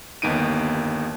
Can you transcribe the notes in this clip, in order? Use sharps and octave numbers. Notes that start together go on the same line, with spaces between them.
G1 D#2 B3 D#4 D7 D#7